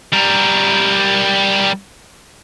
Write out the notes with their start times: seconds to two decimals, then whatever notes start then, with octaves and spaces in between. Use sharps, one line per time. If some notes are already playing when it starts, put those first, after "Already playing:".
0.13 G3 A#4